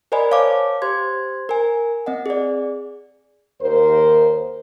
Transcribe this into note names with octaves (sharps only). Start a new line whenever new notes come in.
A#4 C5 D5 D#5 G#5 B5
C#5 F5 A5 D6
G4 C5 C6 G#6
A#4 G#5
C4 D#5 F#5
G#4 D5
D#2 A#4 C5